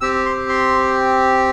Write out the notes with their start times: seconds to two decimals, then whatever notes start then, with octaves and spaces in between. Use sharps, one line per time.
0.01 C4 G4 E6
0.26 C6
0.49 C6